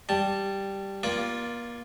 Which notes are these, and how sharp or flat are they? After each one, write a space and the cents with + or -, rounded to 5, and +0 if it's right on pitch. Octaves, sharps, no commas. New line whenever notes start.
G3 +0 A5 +0
A#3 +40 F4 +0 D5 +0